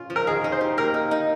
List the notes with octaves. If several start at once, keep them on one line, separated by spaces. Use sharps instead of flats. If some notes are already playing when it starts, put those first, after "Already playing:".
Already playing: C#4 F4
F3
A#4
D#3 G#4
D#4
C5
G4
A#3 A#4
D#4
D#4